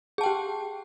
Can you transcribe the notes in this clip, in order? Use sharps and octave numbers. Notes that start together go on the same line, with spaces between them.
G4 G#4 G5 A5